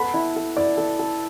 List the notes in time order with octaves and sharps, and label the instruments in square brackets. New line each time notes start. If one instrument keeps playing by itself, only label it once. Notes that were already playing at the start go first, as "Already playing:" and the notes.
Already playing: [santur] B3 A4 [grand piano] B5
[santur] E4
A4
[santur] E4 [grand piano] D5
[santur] A4
A4